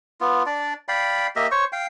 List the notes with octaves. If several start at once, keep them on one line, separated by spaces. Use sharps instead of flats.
B3 F4
D4 D5
D5 F5 G5 B5
A#3 G4 D#5 E5
C5 C#5 C#6
F5 G5